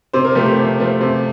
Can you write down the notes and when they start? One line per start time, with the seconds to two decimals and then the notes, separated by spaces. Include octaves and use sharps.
0.13 C3 C5
0.25 A#4
0.35 F3 A3 C4 G4
0.46 G4
0.57 C3
0.79 F3 A3 C4
1.01 C3